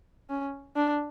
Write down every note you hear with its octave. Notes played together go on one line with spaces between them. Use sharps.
C#4
D4